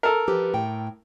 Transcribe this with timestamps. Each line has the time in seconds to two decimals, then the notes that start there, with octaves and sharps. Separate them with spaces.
0.03 A4 A#4
0.28 F3 G4 B4
0.54 A2 G5